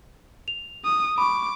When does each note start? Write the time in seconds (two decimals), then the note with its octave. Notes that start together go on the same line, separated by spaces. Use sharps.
0.48 F7
0.85 D#6
1.18 B5 C#6 D6